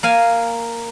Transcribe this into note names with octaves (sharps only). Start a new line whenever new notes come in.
A#3 F5 G#5